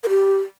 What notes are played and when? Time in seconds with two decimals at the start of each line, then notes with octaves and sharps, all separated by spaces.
0.04 A#4
0.09 G4